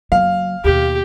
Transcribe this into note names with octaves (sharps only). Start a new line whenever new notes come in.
F#1 F#3 F5
D#2 B2 G4